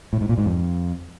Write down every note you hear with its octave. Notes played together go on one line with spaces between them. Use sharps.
A2
G#2
A#2
G#2
F2